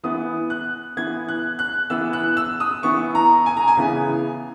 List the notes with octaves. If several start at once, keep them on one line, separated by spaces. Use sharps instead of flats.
E3 B3 D#6
F#6
E3 B3 G#6
F#6
F#6
E3 B3 E6
F#6
E6
D#6
E3 B3 C#6
A#5
G#5
A#5
G#5
C#3 E3 B3